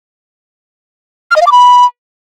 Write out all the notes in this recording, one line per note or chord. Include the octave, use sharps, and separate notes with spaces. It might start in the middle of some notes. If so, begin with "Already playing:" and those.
F6
D#5
F5
D6
B5